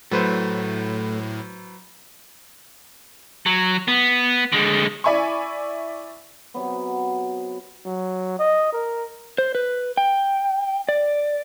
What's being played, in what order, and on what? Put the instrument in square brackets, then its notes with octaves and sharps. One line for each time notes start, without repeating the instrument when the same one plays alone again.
[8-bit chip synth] A2 [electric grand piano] F#3 B4 C5 [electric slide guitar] A3
[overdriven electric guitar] F#3
B3
D3 G#3
[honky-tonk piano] E4 D5 E5 G#5 B5 C#6
[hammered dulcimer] C3 F#3 B3
[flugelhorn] F#3
D#5
A#4
[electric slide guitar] C5
B4
G5
D5